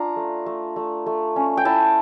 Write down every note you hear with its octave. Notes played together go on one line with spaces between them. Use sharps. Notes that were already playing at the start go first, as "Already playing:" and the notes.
Already playing: D4 F4 A#5
A3
A3
A3
A3
C#4
G5
E4 A5